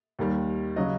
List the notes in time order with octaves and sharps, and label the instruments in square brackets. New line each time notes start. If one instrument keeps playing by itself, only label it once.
[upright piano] D#2 D#3 G3
C#3 F#3 D#5